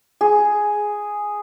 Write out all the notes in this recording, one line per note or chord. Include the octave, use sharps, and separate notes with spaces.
G#4